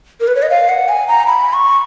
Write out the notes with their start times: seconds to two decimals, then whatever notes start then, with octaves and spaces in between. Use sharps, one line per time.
0.21 A#4
0.28 B4
0.35 C#5
0.42 D#5
0.50 F5
0.69 F#5
0.89 G#5
1.08 A#5
1.27 B5
1.53 C#6